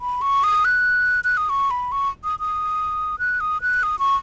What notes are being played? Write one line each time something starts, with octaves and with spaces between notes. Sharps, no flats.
B5
C#6
D#6
F#6
F#6
D#6
C#6
B5
C#6
D#6
D#6
F#6
D#6
F#6
D#6
C#6